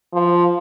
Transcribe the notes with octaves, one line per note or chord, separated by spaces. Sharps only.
F3